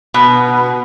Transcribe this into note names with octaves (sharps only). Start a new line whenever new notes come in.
B2